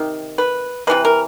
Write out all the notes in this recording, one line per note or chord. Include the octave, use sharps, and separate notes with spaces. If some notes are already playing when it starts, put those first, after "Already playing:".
Already playing: C3 D#3
B4
C3 E3 G#3 B4
A#4